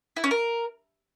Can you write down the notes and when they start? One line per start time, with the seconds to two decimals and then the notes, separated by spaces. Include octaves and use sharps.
0.16 E4
0.24 C#4
0.31 A#4